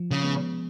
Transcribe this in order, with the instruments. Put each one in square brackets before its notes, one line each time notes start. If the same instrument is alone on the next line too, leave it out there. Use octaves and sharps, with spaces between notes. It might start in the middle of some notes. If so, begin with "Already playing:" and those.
Already playing: [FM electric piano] F3
[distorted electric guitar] C#3
[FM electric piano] G#3 B3